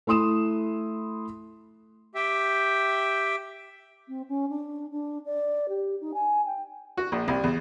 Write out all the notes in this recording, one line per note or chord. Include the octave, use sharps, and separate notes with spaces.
A3 E4 C6 D#6 E7
G4 E5 G5
C4
C#4
D4
D4
D5
G4
D#4
G#5
G5
F#4
A#1
C2
E2